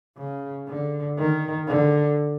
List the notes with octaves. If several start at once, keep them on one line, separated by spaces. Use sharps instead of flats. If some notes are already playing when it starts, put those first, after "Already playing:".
C#3
D3
D#3
D3